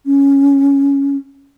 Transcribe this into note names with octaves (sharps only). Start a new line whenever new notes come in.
C#4